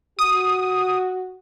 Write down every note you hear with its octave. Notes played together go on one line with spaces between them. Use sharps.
F#4 D#6